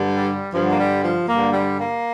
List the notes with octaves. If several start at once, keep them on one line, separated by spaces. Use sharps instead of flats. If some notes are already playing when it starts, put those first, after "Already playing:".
Already playing: G2 D3
G3
G2 D3 F3
A#3
G3
F3
G2 D3 A#3
G3
A#3